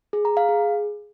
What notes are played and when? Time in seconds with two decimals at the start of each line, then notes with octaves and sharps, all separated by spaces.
0.13 G#4
0.25 A#5
0.37 F5
0.49 G#4